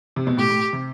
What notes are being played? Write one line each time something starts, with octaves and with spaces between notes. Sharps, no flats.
C3
B2
A2 G4
A2
C3